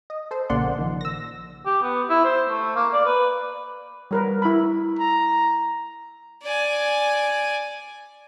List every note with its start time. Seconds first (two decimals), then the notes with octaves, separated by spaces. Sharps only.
0.10 D#5
0.31 A4 C5
0.50 A#1 C#3 A#3 D5 F#5 C6
0.78 D#3 F3
1.01 E6 A#6
1.66 G4
1.82 B3
2.09 E4
2.25 C5
2.50 A3
2.76 A#3
2.93 D5
3.06 B4
4.11 G3 A#4 B4
4.42 E4 B4 B5
4.99 A#5
6.42 D5 G#5